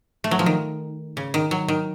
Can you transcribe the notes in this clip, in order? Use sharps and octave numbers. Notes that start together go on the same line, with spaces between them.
A3
F#3
F3
D#3
C#3
D#3
F#3
D#3